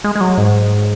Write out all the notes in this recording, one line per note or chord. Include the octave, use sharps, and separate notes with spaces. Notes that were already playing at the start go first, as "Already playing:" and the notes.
G#3
G#3
F#3
G#2